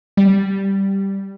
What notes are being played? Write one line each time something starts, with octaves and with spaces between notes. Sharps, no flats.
G3